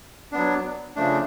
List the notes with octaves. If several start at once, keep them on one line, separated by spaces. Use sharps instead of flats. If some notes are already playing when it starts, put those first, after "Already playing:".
F#3 B3 D4
C#3 F3 A3 D4